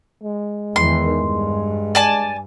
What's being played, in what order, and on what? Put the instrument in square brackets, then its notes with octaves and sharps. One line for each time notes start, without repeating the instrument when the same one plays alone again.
[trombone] G#3
[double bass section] E2 D#3 E3 [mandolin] C6
[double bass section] G2
[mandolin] D5 G#5 A5